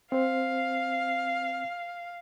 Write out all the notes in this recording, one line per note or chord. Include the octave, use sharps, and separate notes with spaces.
C4 C5 F5